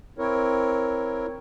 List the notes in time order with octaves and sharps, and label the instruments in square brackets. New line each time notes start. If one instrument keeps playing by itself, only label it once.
[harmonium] C4 E4 A#4 C#5